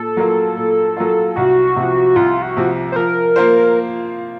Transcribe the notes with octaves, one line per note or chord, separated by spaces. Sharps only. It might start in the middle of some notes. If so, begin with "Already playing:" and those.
Already playing: A#2 A4
F#3 A#3 F4
A#2
F#3 A#3 F4
C2 F#4
C3 F3
C2 F4
F#4
C3 F3
C5
F3 A#4
A#3 F4 C5